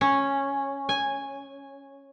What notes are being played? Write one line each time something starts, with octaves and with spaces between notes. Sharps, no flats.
C#4
G#5